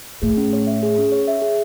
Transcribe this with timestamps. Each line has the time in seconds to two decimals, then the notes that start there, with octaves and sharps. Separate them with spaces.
0.22 A2 G#4
0.37 C#4
0.53 C#5
0.67 E5
0.83 G#4
0.98 C#4
1.12 C#5
1.28 E5
1.42 G#4